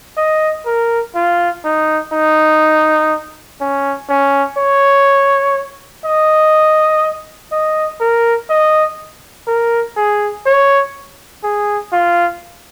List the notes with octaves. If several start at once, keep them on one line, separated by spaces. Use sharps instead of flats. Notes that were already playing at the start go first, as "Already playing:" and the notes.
D#5
A#4
F4
D#4
D#4
C#4
C#4
C#5
D#5
D#5
A#4
D#5
A#4
G#4
C#5
G#4
F4